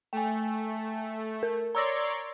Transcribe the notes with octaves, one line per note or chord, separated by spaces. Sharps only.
A3 G5 G#5
A#4
C#5 D5 A#5 C6 E6 A#6